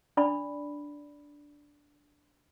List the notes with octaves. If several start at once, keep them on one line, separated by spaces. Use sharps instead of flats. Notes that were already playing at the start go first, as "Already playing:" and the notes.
D4 D5 B5